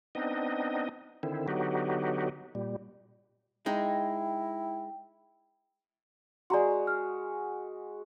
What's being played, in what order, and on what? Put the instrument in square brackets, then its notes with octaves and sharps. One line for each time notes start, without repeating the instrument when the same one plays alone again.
[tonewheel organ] B3 C4 D4 D#4 D#5
D3 D#3 C4 E4
D3 F#3 B3 D#4 F#4 G4
A#2 G3
[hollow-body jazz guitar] G#3 D#4 [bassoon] E4 [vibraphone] G5
[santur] G#3 F#4 [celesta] D5 A#5 C6
[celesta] F6